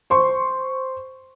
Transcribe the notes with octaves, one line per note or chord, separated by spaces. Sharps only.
C5 C6 C#6